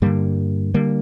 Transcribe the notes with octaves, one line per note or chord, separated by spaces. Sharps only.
G2 D3 G3 A#3
D3 G3 A#3